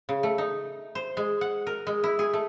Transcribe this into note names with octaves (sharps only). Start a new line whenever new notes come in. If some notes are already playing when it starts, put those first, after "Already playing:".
C#3
A3
D#4
C5
G#3
F#5
A#4
G#3
E4
G#4
A3